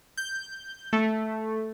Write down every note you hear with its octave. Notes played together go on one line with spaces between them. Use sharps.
G6
A3